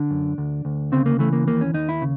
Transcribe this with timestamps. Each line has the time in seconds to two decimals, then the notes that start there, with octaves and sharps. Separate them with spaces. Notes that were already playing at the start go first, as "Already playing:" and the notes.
Already playing: D3 D4
0.10 F#2
0.38 D2
0.65 D2
0.92 C#3 C4
1.06 A#3
1.19 E3 A3
1.33 A#3
1.47 D#2 A#3
1.61 C#4
1.74 D#2 D#4
1.89 E4
2.02 C#3